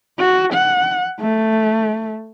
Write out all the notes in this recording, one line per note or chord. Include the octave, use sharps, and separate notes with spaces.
F#4
F#5
A3